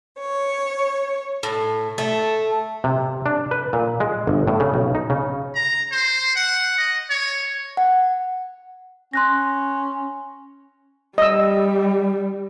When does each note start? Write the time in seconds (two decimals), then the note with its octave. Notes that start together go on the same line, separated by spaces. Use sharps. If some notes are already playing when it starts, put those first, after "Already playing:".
0.19 C#5
1.43 A2
1.98 A3
2.84 C3
3.26 D4
3.51 B4
3.73 A#2
4.00 G#3
4.27 G1
4.48 A2
4.60 C#3
4.74 B1
4.95 D#4
5.10 C#3
5.55 A#5
5.92 C5
6.35 F#5
6.78 D#5
7.10 C#5
7.77 F#5
9.13 C#4 C6 F#6 A#6
11.18 G3 D#5 E6